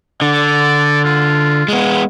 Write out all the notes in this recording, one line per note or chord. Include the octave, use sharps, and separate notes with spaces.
D3 D5
F4
G#3 B3